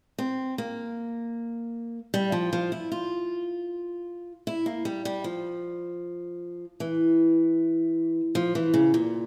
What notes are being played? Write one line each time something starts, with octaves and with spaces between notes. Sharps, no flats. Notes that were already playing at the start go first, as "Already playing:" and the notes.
C4
A#3
G3
F3
F3
E4
F4
E4
A#3
G3
G3
F3
E3
F3
E3
C#3
A#2